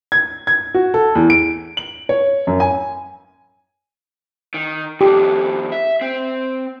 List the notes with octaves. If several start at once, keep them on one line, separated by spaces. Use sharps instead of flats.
G#6
G#6
F#4
A4
E2
D7
F#7
C#5
F#2
G#5
D#3
F2 D#3 G4
E5
C4